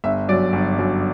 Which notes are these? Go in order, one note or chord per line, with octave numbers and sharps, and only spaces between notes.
G1 E5
F#2 F#3 D5
G1
F#2 F#3